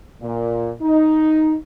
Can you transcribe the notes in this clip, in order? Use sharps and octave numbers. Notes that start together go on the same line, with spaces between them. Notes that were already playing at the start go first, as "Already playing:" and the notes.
A#2
D#4